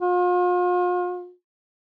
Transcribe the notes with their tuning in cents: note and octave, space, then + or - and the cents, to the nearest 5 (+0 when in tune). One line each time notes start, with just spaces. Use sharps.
F4 +40